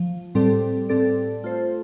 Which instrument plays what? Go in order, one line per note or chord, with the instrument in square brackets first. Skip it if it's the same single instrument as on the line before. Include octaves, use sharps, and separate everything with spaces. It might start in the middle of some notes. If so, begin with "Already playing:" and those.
Already playing: [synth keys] F3
A2 G3 C4 A4 D5
A2 G3 C4 A4 D5
A3 F4 A4 C5